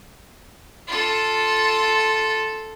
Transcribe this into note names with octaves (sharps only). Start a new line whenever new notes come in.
F4 A4